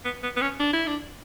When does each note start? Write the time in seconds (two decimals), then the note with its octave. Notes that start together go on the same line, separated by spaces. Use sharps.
0.05 B3
0.23 B3
0.37 B3
0.42 C#4
0.60 D4
0.73 E4
0.87 D4